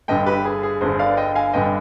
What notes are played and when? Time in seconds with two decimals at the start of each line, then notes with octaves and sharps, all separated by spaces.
0.08 G1 G2 D3 D#5 G5
0.26 G4 B4
0.45 G#4
0.63 G#4
0.81 G1 G2 D3 G#4 C5
0.99 D5 F5
1.17 D#5 G5
1.35 F5 G#5
1.53 G1 G2 D3 D#5 G5